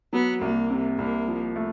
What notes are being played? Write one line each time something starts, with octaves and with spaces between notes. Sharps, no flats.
F#3 B3
C2 A#3
C3
C2 A#3
F3
A3